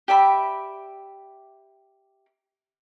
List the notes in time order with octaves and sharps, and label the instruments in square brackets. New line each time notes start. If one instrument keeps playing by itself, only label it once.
[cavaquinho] G4 D5 E5 B5